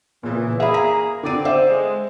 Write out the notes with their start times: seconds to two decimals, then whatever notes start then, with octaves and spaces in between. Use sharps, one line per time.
0.23 A#2 C#3 E3
0.60 A#3 G#4 E5 B5
0.74 A#5
1.23 D3 C4 D5 D#7
1.45 C5 E5
1.69 G#3